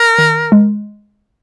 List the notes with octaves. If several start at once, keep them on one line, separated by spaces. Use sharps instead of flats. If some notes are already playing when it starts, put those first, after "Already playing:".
Already playing: A#4
D#3
G#3